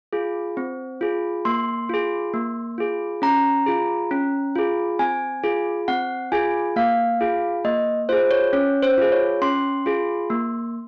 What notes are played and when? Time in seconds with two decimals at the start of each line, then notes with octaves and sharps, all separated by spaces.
0.13 F4 G#4
0.57 C4
1.01 F4 G#4
1.45 A#3 C6
1.89 F4 G#4
2.34 A#3
2.78 F4 G#4
3.22 C#4 A#5
3.66 F4 G#4
4.11 C#4
4.55 F4 G#4
4.99 C4 G#5
5.43 F4 G#4
5.88 C4 F#5
6.32 F4 G#4 G#5
6.76 A#3 F5
7.21 F4 G#4
7.64 A#3 D#5
8.09 F4 G#4 C5
8.31 C#5
8.53 C#4 C#5
8.82 C5
8.98 F4 G#4
9.12 C#5
9.42 C#4 C6
9.86 F4 G#4
10.30 A#3